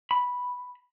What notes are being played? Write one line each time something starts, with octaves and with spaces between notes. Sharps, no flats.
B5